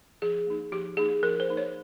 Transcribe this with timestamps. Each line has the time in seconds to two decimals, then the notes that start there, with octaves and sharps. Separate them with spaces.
0.22 F3 G#4
0.47 A#3 D#4
0.72 F3 G4
0.97 A#3 D#4 G#4
1.23 F3 A#4
1.40 C5
1.48 A#3 D#4
1.57 C#5